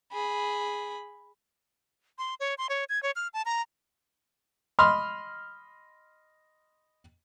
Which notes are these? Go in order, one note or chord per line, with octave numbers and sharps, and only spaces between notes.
G#4 B5
C6
C#5
C6
C#5
G#6
C#5
F6
A5
A#5
D#5 B5 C6 F6